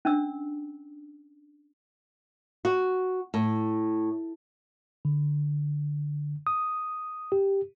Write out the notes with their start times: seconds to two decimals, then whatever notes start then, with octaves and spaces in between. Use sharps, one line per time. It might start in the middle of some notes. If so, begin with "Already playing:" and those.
0.05 C#4 D4 E6
2.65 F#4
3.34 A2
5.05 D3
6.47 D#6
7.32 G4